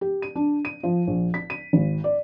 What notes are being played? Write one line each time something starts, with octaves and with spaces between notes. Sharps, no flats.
G4
D#7
D4
D#7
F3
A#1
B6
D#7
G#1
D5